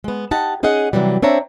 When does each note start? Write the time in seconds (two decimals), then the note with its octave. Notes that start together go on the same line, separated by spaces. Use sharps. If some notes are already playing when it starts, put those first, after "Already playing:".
0.04 G#3 B3
0.31 D#4 G4 F#5 A5
0.63 C#4 D#4 G#4 D#5 F#5
0.93 C3 E3 F#3 G3
1.22 C4 D4 C#5 E5 A#5